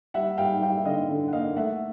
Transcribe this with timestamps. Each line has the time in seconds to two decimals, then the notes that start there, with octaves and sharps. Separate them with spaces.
0.14 G3 E5 F#5
0.38 G3 F5 G5
0.61 G3 F5 G5
0.77 E5
0.85 D3 D#5 F5
1.09 D3
1.28 F#5
1.33 A#3 D#5 F5
1.56 A3 E5 F#5